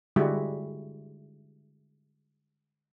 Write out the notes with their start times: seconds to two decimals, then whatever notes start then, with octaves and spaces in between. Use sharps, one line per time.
0.16 D3 G3 G#3 E4 F#4